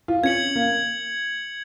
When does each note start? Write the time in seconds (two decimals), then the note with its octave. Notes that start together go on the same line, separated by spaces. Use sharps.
0.08 F4
0.23 C#4 G#6 C#7 F#7
0.55 A#3